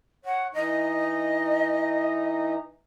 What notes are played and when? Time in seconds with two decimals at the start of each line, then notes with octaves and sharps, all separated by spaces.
0.25 C#5 F#5
0.53 E3 D#4 D#5